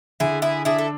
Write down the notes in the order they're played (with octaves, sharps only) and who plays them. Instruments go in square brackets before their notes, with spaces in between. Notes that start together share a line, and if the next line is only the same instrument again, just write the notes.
[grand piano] D3 [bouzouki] E4 G#4
[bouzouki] E4 G#4
[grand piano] D4 [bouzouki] E4 G#4
[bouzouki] A4